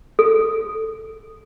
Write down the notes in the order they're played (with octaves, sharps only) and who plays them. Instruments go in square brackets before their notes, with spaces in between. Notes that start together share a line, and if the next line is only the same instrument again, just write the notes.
[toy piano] A4